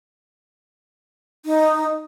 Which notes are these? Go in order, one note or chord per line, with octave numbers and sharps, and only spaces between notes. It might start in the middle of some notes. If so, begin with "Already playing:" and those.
D#4